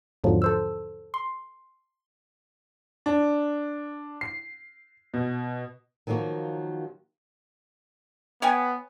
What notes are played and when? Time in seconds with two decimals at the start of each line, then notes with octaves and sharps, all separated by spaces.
0.24 E2 G#2 D3 F3 F#3
0.42 A4 C5 E6
1.14 C6
3.06 D4
4.21 C7
5.14 B2
6.07 D#3 F3 F#3 A#3 F#4
8.42 B3 C#5 G5 G#5